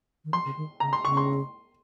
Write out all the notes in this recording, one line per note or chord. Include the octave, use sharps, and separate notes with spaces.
D#3
F3 C6
C#3
D#3
C#3 A#5
C6
C#3 C#6
C6